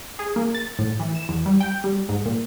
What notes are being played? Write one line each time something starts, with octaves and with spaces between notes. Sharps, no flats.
G#4
A#3
A6
A2
E3
E7
E2
G3
G5
G3
G#2
A#2